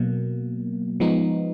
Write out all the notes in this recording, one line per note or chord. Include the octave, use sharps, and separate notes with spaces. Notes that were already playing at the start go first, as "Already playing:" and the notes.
Already playing: B2 F#3 A#3
F3 G#3 B3 D#4